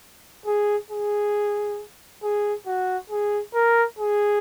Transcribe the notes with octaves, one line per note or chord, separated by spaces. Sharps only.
G#4
G#4
G#4
F#4
G#4
A#4
G#4